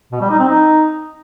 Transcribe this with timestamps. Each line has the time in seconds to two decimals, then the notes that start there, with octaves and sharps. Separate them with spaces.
0.12 B2
0.21 G3
0.30 D#4
0.39 C4
0.49 D#4